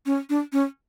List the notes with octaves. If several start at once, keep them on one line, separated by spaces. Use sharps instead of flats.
C#4
D4
C#4